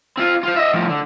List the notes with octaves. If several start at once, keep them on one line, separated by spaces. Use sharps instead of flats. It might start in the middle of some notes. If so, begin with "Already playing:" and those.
C4 F4
F4 C5
D#5 E5
A2 F3
D3